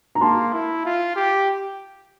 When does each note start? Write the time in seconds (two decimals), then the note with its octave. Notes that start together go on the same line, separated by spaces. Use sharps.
0.15 A#5
0.21 A#3 A5 C6
0.53 E4
0.85 F4
1.16 G4